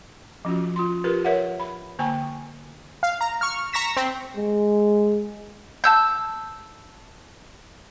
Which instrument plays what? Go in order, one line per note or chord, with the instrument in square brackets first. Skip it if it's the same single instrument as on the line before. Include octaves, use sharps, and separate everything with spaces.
[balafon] F3 C#4 F4 F#4
F4 C6
F4 G4 A#4 B4
A#4 C#5 E5 F#5
B5
D3 A#3 G5 G#5 A#5
[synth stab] F5
A#5
C#6 F6
A#5 C#6 A#6 B6 E7
C4
[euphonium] G#3
[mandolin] A5 E6 G6